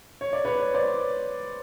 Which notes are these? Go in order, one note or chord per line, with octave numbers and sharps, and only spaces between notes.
C#5
D5
B4 C#5
C5 D5